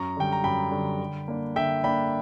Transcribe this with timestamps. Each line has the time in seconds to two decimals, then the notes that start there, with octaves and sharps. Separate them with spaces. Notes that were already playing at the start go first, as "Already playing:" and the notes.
Already playing: F#2 A#5 C#6
0.17 D3 G3 G5
0.32 A#5
0.44 F#2 G5 B5
0.71 D3 G3
1.00 D3
1.28 A#3 D4
1.56 D3 E5 G5
1.84 A#3 D4 G5 B5